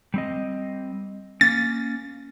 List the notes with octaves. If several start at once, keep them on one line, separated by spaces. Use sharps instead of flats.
G3 C4 D#5
A#3 C#4 A6